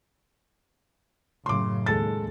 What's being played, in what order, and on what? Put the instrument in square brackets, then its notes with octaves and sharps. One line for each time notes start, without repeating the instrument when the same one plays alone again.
[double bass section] F#2 A2 C#3 [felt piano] C6 D6
[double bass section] D#2 [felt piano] G#3 A4 A6